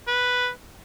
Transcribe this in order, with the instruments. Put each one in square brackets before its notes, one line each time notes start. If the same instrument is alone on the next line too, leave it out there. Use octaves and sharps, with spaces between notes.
[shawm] B4